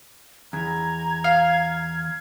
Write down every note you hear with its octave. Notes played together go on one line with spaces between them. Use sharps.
E2 A#5 G#6
F5